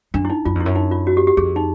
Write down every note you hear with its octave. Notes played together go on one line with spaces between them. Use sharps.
F#2 D4
E4
D#4
F#2 F4
F2
E4
F#2
D#4
F4
F#4
G4
G4
F2 G#4
D#4